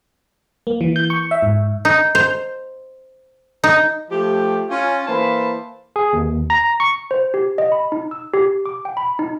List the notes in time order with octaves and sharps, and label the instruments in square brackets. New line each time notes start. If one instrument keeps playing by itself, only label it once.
[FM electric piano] A#3
E3
G6
C#6
E5
G#2
[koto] D#4
C5
D#4
[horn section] F3 A3 G4
C#4 F4
E3 A#3 C5 A5 B5
[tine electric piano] G#4
D#2
A#5
C#6
[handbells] C5
G4
D#5
B5
D#4
E6
G4
D6
G5
B5
D#4